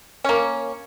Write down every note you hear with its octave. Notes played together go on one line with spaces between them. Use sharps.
A#3 C#4